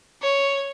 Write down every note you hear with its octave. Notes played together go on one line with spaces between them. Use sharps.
C#5